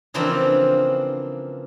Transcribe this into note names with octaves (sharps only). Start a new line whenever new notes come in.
C#3 E3 F3 A#3 C4 D4